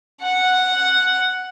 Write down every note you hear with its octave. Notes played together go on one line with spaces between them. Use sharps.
F#5